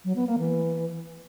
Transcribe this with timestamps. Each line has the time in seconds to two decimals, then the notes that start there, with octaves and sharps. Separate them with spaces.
0.05 F#3
0.16 B3
0.27 A#3
0.38 E3